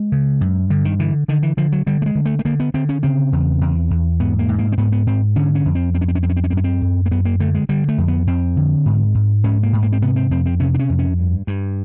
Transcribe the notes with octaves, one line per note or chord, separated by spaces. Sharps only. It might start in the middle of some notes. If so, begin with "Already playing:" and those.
Already playing: G#3
C#3
F#2
G2 D3
D#3
D3 E3
D3 D#3
E3
D3 F3
F#3
D3 G3
A3
G#3
D3
A3
A3
D3 A#3
B3
D3 C4
C#4
C#3 C4
E2
E2
E2
G#2 B3
A#3
G#2
A#3
C4
G#2 B3
B3
G#2 C4
D3 C#4
C#4
F2
C4
F2 C4
C#4
C4
C#4
F2 C4
C#4
C4
C#4
F#2 C4
C#4
C4
F#2
A#3
F#2 B3
A#3
D3 A3
G#3
D3 G3
A3
F2
B3
F2 C4
D3
G#2
G#2
G#2 C#4
A#3
G#2
A#3
C4
C3 B3
C4
F2 C4
C4
C3 C#4
D4
C#4
F2
C#4
G2
G2